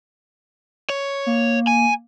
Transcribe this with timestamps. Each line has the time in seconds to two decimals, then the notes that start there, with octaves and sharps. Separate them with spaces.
0.90 C#5
1.26 A#3
1.67 G#5